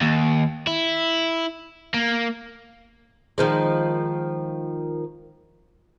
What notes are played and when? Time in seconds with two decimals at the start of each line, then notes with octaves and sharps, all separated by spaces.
0.02 D#2
0.67 E4
1.94 A#3
3.38 D#3 F3 G#3